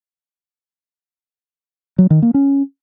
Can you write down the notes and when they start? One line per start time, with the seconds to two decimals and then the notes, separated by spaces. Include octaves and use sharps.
1.98 F#3
2.10 D#3
2.22 A#3
2.34 C#4